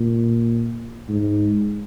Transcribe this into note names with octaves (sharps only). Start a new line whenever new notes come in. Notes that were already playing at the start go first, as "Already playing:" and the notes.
Already playing: A#2
G#2